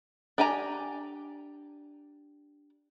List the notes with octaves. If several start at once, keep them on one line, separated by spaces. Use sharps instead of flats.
D4 G4 G#5 A#5